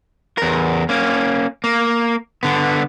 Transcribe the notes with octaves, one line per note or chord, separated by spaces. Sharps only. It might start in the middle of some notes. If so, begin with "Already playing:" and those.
E2 A#4
A#3 C#4
A#3
D3 B3